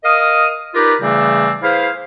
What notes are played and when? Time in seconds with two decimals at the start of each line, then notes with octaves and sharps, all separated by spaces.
0.04 A#4 D#5 F5 D#6
0.74 D#4 F4 G4 A#4 B4 D5
1.01 C#3 E3 G3 A3 C4 D4
1.61 E4 G#4 B4 C5 F5